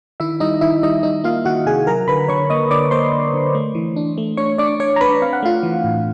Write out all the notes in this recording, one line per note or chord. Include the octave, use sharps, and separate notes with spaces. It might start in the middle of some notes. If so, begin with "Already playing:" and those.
D#3 E4 E5
G3 D#4 D#5
D#3 E4 E5
G3 D#4 D#5
G3 D#4 D#5
A#3 F4 F5
D#3 F#4 F#5
C3 G#4 G#5
F#3 A#4 A#5
D3 B4 B5
D3 C#5 C#6
A#3 D#5 D#6
D3 D5 D6
A#3 C5 C6
D3
D3
A3
E3
D4
A3
D4 C#5 C#6
D4 D5 D6
D4 C#5 C#6
A#5
D4 B4 B5
C4 F5
F#5
A3 F4 F5
E3
A2